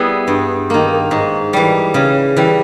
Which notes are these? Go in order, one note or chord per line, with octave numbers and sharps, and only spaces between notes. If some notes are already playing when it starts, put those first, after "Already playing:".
Already playing: G3 B3 E4 G#4
G2
D#3 A#3
G#2
E3 G3
C#3
E3 G3